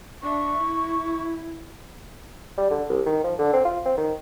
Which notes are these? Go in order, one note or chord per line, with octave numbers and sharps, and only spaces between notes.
D4 E5 C#6
E4
G3
D3
C2
D#3
F3
D3
C4
F4
C4
D#3